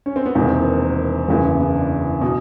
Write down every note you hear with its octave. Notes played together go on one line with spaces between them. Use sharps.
C#4
C4
B3
E1 E2 C3 D#3 A#3
C4
B3
F#1 E2 C#3 E3 A#3
B3
B3
D4
B2